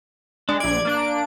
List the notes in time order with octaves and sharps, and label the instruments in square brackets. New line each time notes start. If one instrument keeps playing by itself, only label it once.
[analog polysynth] G#3 [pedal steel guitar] D4
[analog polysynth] A#1 G#6 [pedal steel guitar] D5
[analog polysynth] A#3 D4 D7